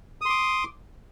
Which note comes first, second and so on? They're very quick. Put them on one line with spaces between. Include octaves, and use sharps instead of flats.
D#6 C6 D6